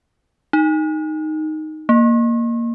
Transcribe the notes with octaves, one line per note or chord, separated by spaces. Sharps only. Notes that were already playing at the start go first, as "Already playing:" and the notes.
D#4
A#3